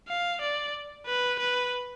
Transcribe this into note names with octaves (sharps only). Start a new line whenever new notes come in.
F5
D5
B4
B4